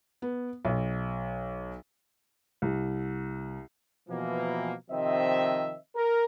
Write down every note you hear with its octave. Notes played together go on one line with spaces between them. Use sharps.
B3
B1
C2
B2 E3 F3 A#3
C3 D#3 F3 C4 D#5 E5
A#4